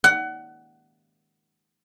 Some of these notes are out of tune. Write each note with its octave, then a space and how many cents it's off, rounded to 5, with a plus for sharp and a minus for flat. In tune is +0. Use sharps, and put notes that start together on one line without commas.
F#5 +25